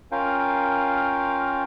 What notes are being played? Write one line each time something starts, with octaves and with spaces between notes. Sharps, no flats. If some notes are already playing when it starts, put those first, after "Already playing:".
C#4 F4 A#4 F5 G5